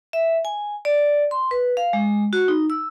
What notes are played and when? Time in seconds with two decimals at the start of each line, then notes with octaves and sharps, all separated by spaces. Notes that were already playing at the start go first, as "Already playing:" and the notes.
0.13 E5
0.45 G#5
0.85 D5
1.31 C6
1.51 B4
1.77 F5
1.93 G#3
2.33 F#4
2.48 D#4
2.70 E6